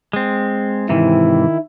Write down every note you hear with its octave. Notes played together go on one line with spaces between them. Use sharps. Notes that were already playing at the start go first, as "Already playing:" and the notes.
G#3 C4
G#2 C3 D#3 E3 E4